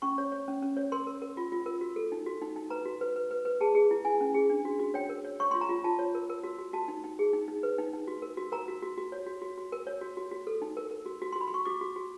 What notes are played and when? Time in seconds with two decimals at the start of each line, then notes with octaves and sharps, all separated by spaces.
0.02 C#4 C#6
0.18 C#5
0.32 C#5
0.48 C#4
0.62 C#4
0.77 C#5
0.92 A#4 C6
1.07 A#4
1.22 A#4
1.37 F4
1.52 F4
1.66 A#4
1.81 F#4
1.96 A4
2.12 D#4
2.27 F#4
2.42 D#4
2.56 D#4
2.70 B4 A#5
2.86 F#4
3.01 B4
3.16 B4
3.31 B4
3.45 B4
3.60 G#4 A5
3.75 G#4
3.91 E4
4.05 E4 G#5
4.21 C#4
4.35 G#4
4.50 D4
4.65 F#4
4.79 F#4
4.94 C#5 G5
5.09 A#4
5.25 C#5
5.40 C#5 C#6
5.51 F4 C6
5.61 A#5
5.69 F4
5.84 F4 A5
5.99 C#5
6.15 A#4
6.30 A#4
6.44 F#4
6.58 F#4
6.73 F#4 A5
6.88 D#4
7.04 D#4
7.19 G#4
7.33 D#4
7.48 D#4
7.63 B4
7.78 D#4
7.93 D#4
8.08 F#4
8.22 A#4
8.37 F#4
8.52 A#4 A#5
8.68 F#4
8.82 F#4
8.98 F#4
9.12 C#5
9.27 F#4
9.42 F#4
9.58 F#4
9.72 A#4
9.87 C#5
10.01 F#4
10.17 F#4
10.31 F#4
10.47 A4
10.62 D#4
10.77 A#4
10.91 A#4
11.06 F#4
11.22 F#4
11.32 C6
11.36 F#4
11.41 B5
11.47 C6
11.50 F#4 C#6
11.65 F#4 D6
11.81 F#4
11.96 F#4